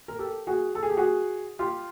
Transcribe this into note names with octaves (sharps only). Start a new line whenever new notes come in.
A#4
G4 A4
F#4 G#4
A4
G#4
G4
F#4 G#4
F4 G4